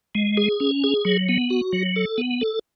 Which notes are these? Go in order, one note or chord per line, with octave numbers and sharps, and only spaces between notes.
G#3
G#4
C#4
G#4
F#3
B3
F#4
F#3
A4
B3
A4